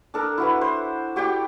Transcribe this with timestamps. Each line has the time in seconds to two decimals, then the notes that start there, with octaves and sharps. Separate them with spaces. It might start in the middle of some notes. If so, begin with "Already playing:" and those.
0.14 D4 A4 A#4
0.38 E4 F#4 B4
0.61 C5
1.16 F#4 G4 D5 G5